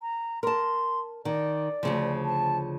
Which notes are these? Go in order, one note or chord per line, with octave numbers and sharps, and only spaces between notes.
A#5
A#4 A5 C6
D#3 D5
D2 C#3 F3
A5